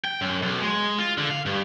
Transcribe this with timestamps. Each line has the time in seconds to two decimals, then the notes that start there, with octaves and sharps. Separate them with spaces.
0.05 G5
0.21 F#2
0.42 B1
0.62 G#3
0.98 F4
1.18 D3
1.30 F5
1.46 G2